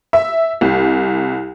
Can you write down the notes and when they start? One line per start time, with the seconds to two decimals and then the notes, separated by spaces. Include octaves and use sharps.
0.13 E5
0.61 C2